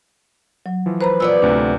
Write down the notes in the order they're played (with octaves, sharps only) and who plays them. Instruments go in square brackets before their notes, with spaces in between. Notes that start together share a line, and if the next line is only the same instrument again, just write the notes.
[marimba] F#3
[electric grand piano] E3 F3
[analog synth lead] B4 [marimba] C5 A#5 B5
[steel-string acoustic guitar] A#2 B3 D5 [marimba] E6
[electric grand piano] D2 A2 C3 [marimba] D4